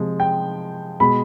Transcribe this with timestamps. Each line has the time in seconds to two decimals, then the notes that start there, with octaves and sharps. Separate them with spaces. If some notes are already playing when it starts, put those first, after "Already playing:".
Already playing: C3 F3 G#3
0.20 G5
1.00 B2 G#3 B5